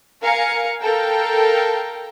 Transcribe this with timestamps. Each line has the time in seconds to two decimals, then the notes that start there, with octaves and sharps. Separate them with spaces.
0.22 A#4 F5 G#5 C#7
0.80 A4 A#4 F5 G5